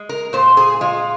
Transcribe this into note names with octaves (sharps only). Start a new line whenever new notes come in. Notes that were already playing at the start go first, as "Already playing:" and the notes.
Already playing: G#3
A#4
A#2 C5
G#4
G#3 F4